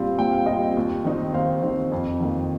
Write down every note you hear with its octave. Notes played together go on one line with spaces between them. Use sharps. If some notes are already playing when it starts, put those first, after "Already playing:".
Already playing: A#2 G3 C4 F4 C5
A#2 G5
F5
G3 C4 F4 D#5 G5
D#2
D#3 C4 D#4
D#2 C5 F5
D#3 C4 D#4
F2
D#3 A#3